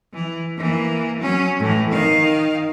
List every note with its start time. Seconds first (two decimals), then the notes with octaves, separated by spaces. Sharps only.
0.13 E3
0.58 E3 A#3
1.20 F#3 C#4
1.59 A2 E3
1.90 D#3 F5